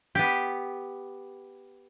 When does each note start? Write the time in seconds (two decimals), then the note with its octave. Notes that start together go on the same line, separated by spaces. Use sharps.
0.15 B3 G4